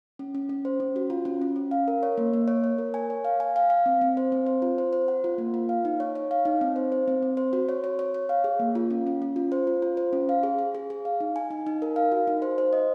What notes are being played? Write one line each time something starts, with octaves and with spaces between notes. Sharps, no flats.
C#4
C#4
C#4
C5
C#4
F#4
F4
C#4
C#4
C#4
F5
A#4
C#5
A#3
A#3
C#5
C#5
A#4
G#5
C#5
F5
G#5
F5
F5
C4
C4
C5
C4
C5
F4
C5
C5
F#5
F4
A#3
F4
F5
D#4
C#5
C#5
F5
D#4
C4
C5
C5
C4
C4
C5
F#4
C#5
C#5
C#5
C#5
F5
G#4
A#3
F4
C#4
C#4
C#4
F4
C5
F4
F4
C5
C#4
F5
G#4
G#4
G#4
G#4
F5
D#4
G#5
D#4
D#4
A#4
F5
F#4
D#4
C5
C5
D#5